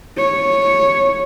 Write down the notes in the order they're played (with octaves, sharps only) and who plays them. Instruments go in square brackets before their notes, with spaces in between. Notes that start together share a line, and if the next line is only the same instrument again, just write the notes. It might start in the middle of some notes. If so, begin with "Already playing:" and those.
[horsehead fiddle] C#5